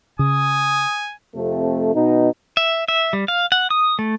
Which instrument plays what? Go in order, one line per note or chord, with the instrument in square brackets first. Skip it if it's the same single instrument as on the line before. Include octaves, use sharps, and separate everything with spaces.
[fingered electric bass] C#3 [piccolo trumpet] G#5 [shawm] D#6
[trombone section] F2 C3 A3
B2 D#4
[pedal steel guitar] E5
E5
G3
F5
F#5
D#6
A3